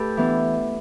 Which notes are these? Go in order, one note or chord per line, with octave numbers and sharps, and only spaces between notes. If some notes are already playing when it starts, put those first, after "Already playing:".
Already playing: A3 G4 A4 B4
E3 B3 D4